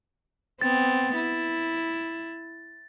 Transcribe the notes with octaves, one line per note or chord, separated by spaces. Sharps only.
B3 C4 A6
E4